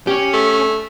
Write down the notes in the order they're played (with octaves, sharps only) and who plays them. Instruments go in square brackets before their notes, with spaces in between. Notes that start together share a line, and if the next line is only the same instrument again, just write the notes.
[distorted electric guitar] C#4 [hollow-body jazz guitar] G4
[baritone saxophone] A3